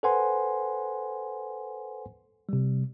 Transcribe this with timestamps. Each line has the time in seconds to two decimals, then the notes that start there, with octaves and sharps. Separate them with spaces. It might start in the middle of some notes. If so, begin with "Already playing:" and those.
0.03 A4 B4 C5 F#5 G#5 C6
2.49 C3 G3